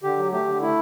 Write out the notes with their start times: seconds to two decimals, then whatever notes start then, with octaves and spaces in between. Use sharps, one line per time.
0.03 D3 G4
0.18 F#3
0.32 A3 G4
0.47 D3
0.61 A3 E4